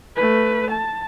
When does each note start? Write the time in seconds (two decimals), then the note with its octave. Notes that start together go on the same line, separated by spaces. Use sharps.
0.16 A3 B4
0.71 A5